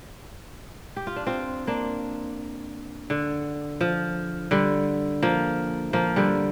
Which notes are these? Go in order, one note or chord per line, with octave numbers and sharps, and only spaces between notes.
G4
F4
D4
C4 F4
A#3 D4
D3
F3
D3 G3
F3 A#3
F3 A#3
D3 G3